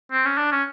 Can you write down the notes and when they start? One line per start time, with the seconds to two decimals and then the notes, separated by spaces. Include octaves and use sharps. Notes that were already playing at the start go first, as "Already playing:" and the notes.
0.12 C4
0.25 C#4
0.37 D4
0.51 C#4